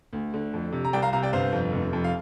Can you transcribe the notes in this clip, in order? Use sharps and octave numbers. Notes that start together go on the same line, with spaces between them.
D2
D3
F2
C3
A#5
C2 D5 G5
F5 A#5
C3 F5 A#5
D5 G5
G1 C5 F5
F2
F1
F2
F5